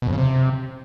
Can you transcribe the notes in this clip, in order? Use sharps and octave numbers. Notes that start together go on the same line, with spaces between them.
B2
F2
C#3
C3